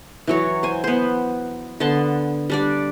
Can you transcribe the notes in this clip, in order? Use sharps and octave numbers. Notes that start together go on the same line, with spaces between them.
E3 F#3 C#5
C5 G#5
B3 C5
D3 B3 A5 C6
G3 D4 D5